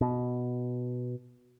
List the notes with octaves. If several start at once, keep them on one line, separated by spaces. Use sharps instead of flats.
B2